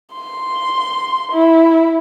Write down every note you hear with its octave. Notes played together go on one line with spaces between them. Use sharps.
C6
E4